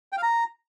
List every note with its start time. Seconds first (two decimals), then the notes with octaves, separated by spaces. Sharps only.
0.12 G5
0.18 F5
0.23 A#5